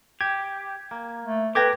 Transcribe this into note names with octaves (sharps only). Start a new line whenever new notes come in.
G4 G#6
A#3
A3
G4 A4 B4 G5 A5 D6 G#6 A#6